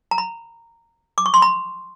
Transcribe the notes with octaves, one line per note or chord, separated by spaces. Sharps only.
A#5
B5
D6
C#6
C6
B5